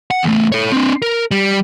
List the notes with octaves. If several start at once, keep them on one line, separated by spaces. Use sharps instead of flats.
F#5
E2 A3
A4 C#5
C4 D4
A#4
G3